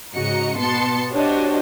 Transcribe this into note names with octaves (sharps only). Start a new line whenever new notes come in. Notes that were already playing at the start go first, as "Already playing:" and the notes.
G#2 C#3 F#4 D#5 A#5 C#7
B2 B3 A5 C6 C#7
D4 F#4 G4 C5 C#5 D#5